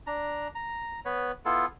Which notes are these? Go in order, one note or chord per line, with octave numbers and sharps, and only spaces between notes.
D4 A#5
A#5
B3 B4 C#5
B3 E4 F4 A4